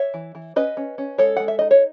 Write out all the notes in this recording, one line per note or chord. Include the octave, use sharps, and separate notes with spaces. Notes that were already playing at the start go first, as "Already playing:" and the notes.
Already playing: C#5 E5
E3
E3
C#4 B4 D#5
C#4
C#4
G#3 A4 C#5
G#3 F#5
E5
D#4 D#5
C#5